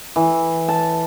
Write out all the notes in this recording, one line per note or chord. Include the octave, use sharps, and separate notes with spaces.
E3
A5